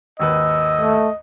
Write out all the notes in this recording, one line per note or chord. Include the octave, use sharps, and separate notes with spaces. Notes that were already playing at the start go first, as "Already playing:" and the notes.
G#1 D#2 B4 D#5 E6
A3